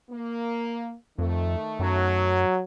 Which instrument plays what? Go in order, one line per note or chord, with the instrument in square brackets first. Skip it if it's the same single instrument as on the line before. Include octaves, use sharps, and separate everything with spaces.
[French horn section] A#3
[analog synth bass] F2 [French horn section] D#3 A3
[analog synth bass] F#2 [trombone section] F#3